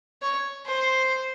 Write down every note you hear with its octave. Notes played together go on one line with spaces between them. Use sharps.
C#5
C5